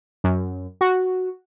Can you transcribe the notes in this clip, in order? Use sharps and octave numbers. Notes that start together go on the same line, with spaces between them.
F#2
F#4